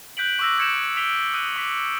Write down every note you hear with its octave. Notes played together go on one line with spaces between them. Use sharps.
F#6 G6 B6 D7 F#7
C#6 D6 E6 F#6 A#6
D#6 G6 G#6 C#7 D7 E7
D#6 B6 D7 F7 G7
D#6 F#6 D#7
D6 B6